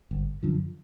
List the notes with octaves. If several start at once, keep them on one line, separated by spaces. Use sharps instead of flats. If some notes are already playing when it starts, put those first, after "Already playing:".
G1
F#2 D3 F3